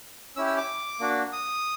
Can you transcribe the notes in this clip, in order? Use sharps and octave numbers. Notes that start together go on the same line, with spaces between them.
C#4 E4 G4 E6
E6
D6
A#3 D4 F#4
D#6